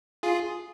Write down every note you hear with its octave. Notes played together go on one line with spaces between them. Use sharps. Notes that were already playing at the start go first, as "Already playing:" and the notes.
F4 G#4